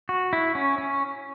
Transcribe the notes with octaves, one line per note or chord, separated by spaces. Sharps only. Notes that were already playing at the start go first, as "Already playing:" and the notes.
F#4
E4
C#4
C#4